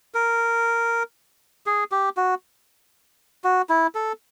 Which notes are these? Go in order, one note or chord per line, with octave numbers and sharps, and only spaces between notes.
A#4
G#4
G4
F#4
F#4
E4
A4